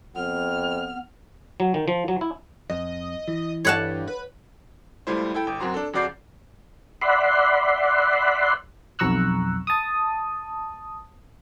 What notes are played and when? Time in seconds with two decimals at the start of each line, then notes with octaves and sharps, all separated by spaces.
0.16 F2 B3 F6
1.60 F#3
1.74 D#3
1.88 F3
2.08 F#3
2.21 E4
2.70 F2 D#5
3.28 E3
3.65 G2 C#5 F#5 A5
4.08 B4
5.07 C#2 G3 A3 E4 F4 C5
5.34 E4 A4 G5
5.47 G1 G5
5.60 F#2 C4 F#4 A#5 C6
5.74 D4 A4
5.93 F2 C#3 F#4 D5 G6 C7
7.01 D5 E5 F#5 B5 C6
8.99 B1 F2 A#5 C#6 E6 F#6
9.67 A5 D#6